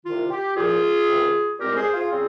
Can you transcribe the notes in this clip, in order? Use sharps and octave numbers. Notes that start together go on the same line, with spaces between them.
C2 C3 D#3 F4
G4
C2 A#2 F3 F4 G#4
C#2 C3 D#3
C2 A#2 G#3 C4 G4 A#4
G#4 C5
F4 G#4
C#3 G3 C4 F4